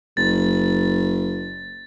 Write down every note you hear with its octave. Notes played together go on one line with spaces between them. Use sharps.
F#1 A6